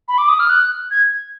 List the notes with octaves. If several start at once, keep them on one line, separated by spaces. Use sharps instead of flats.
B5
D6
D#6
F6
F#6
G#6